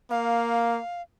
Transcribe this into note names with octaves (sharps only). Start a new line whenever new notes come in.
A#3 F5